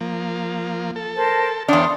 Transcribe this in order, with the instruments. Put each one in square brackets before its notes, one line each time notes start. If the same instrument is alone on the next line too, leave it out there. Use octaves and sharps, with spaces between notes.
[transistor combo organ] F3 A#3
A4
[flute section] A#4 C5 A5
[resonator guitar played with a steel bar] E2 D4 [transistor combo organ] C#5 F5 G5 [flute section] C6 D#6